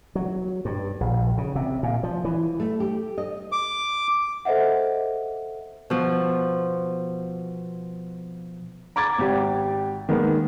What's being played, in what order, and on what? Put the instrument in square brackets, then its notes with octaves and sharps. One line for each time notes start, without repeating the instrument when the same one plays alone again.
[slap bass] F#3
G2
A#1
C#3
C3
A#2
F3
E3
[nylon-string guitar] A3
G4
D#5
[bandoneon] D6
[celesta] A4 C5 D#5 E5 F#5
[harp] B2 F3
[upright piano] A#5 D6 G#6 A6
G#1 G4
D#3 G#3 A#3 B3